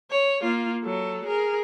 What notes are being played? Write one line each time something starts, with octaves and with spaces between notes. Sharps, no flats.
C#5
A#3 F4
F#3 A4
G#4 A#4